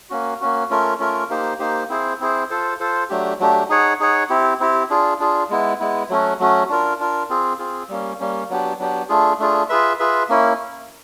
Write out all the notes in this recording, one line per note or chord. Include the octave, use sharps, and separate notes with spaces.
A#3 C#4 F#4
A#3 C#4 F#4
A3 C#4 F4 A#4
A3 C#4 F4 A#4
A#3 D#4 G4 C5
A#3 D#4 G4 C5
C4 E4 G#4 C5
C4 E4 G#4 C5
F4 A4 C5
F4 A4 C5
F#3 A3 D4 G4
F#3 A3 D4 G4
D#4 G#4 C#5 F#5
D#4 G#4 C#5 F#5
C4 E4 G4
C4 E4 G4
D4 F4 G#4
D4 F4 G#4
G#3 B3 E4
G#3 B3 E4
F#3 A3 C#4 F#4
F#3 A3 C#4 F#4
D4 F4 A#4
D4 F4 A#4
C4 F4 G#4
C4 F4 G#4
G3 A#3 C#4
G3 A#3 C#4
F#3 B3 D4 G4
F#3 B3 D4 G4
A3 D4 F4 G#4
A3 D4 F4 G#4
F4 G#4 B4 E5
F4 G#4 B4 E5
A#3 C#4 E4